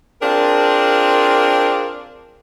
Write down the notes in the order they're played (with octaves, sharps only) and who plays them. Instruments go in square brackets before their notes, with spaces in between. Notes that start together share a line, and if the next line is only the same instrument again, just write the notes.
[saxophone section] C4 D4 F4 G#4 A#4